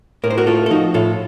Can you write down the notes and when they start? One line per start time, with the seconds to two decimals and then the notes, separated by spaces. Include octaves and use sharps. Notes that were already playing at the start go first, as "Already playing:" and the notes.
0.24 A2 A#4
0.30 C5
0.38 F#4 A#4
0.47 A3 F4 A4
0.66 A4
0.70 F3 D#4 F#4
0.94 A2 F4 A4